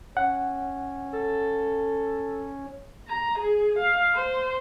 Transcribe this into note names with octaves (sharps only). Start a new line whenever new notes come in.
C#4 F#5
A4
A#5
G#4
F5
C5